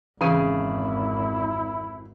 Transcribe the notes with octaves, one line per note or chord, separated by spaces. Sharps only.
G#1 F2 C#3 E3 E4 G#4